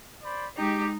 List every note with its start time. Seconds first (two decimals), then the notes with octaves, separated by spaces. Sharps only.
0.23 C5 D5 B5
0.57 G#3 D#4 G4